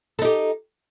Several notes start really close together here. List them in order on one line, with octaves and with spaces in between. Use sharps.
A4 D#4 G4